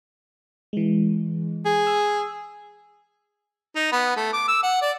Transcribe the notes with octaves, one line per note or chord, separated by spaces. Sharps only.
E3 G#3
G#4
E6
D#4
B3
A3
D6
E6
F#5
D5